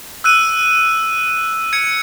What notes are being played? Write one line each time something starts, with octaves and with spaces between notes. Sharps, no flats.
E6 F#6 D#7
G#6 C#7